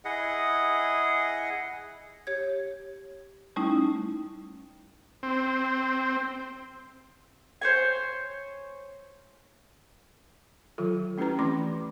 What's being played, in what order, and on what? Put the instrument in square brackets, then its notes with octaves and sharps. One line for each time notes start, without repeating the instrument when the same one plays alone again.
[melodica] E4 G#4 D#5 F#5
[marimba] G4 C#5 G#6
G3 A3 C#4 D#4 E4
[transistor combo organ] C4
[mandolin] C5 C#5 G#5
[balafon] D#3 F#3 F4 A4
A3 C#4 E4 G4 B4 A#5
E3 A3 C4 B5 C6 D6